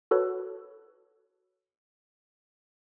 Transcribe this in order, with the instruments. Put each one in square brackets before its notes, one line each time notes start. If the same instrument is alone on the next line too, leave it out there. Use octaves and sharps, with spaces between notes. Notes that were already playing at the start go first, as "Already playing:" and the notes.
[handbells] F#4 A4 B4 C#5